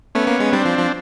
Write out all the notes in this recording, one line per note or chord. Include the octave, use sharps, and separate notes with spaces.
A3 B3 C#4
A#3
G#3
G3 C4 D4
F3
F3